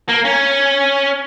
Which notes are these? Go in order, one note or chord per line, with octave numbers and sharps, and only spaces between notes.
A#3
C#4